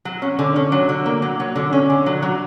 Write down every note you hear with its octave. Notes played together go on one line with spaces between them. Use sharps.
F#3
C#4
D3
C#4
F#3
D3
A#3
F#3
F#3
D3
C#4
D3
F#3
F#3